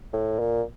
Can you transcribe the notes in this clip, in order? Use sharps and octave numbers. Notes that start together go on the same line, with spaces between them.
A2
A#2